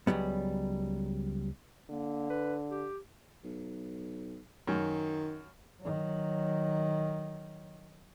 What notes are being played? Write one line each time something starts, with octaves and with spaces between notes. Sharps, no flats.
C#2 F#3 G3 B3
D3 A#3
B4
G4
B1
F#2 D#3
D#3 F#3